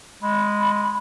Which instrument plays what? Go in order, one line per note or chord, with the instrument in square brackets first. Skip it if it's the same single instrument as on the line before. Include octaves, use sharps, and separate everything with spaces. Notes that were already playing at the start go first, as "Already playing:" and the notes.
[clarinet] G#3 [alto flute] B5